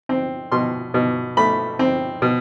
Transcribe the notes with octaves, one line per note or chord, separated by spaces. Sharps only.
C4
B2 C6
B2
A3 B5
C4
B2